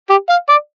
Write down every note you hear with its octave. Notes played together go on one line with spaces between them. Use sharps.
G4
F5
D5